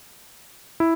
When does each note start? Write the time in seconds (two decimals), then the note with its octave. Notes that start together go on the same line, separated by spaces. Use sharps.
0.80 E4